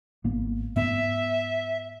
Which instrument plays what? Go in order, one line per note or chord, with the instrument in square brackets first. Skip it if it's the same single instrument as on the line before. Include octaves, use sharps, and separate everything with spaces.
[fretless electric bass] G#1 A#3 B3
[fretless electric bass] G#2 B3 [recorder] E5